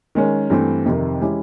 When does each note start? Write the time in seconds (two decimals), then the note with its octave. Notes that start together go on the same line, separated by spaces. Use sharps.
0.15 D#3 G#3 C#4
0.50 G2 E3 A3 C4
0.86 F2 C3 D#3
1.21 E3 G#3 C#4 E4 G4